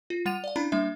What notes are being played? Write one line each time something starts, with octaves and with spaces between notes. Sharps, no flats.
F4
G3 F#5 A6 D#7 F7
D5 F5
C#4 D4 E4 A#5 B5
G3 A#3 D4 E5